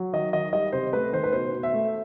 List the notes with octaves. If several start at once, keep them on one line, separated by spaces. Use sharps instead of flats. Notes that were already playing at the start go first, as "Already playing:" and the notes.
Already playing: F#3
D#3 D#5
D#3 D#5
G3 D#5
C3 C5
A3 B4
D#3 C5
B4
B2 C5
B2
E5
A3